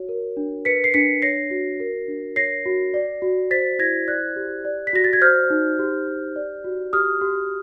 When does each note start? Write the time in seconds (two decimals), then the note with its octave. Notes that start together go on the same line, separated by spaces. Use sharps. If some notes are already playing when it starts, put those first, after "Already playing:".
Already playing: F#4 C#5
0.09 A#4
0.37 D4
0.65 B4 B6 C#7
0.84 C7
0.94 D4 B6 C#7
1.22 C#5 A#6 C7
1.51 F#4
1.80 A#4
2.08 D4
2.36 C#5 A#6 C7
2.65 F#4
2.94 D5
3.22 F#4
3.51 C5 A6 B6
3.79 E4 G#6 A#6
4.08 D5 F#6 G#6
4.36 G4
4.65 D5
4.87 B6
4.93 F#4 A#6
5.04 A6
5.13 G#6
5.21 C5 F6 G6
5.50 D#4
5.79 G4
6.07 G4
6.36 D5
6.64 F#4
6.93 G4 D#6 F6
7.21 G4